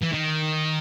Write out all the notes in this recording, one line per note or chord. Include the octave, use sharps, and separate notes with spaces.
E3
D#3